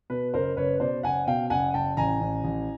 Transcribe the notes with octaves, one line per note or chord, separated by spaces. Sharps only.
B2 B4
F#1 A#4 C5
F#1 B4 C#5
B2 C5 D5
F#1 F#5 G#5
B2 F5 G5
F#1 F#5 G#5
F#1 G5 A5
A1 G#5 A#5
A1
A1